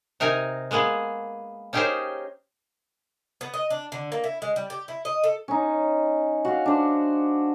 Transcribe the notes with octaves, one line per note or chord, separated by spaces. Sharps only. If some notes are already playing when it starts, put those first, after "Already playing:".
C3 D#4 A#4 G#5
G#3 A#3 B3 G#4
C#4 D#4 G4 G#4 A#4 C5
B3
D#5
D4
D3
A#3
E4
G#3
G3
G4
E4
D#5
A4
C#4 D#4
F#4 F5
D4 C5